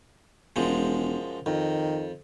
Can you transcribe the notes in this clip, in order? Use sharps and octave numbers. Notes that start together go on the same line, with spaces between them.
E1 F#2 F3 G#3
F2 D#3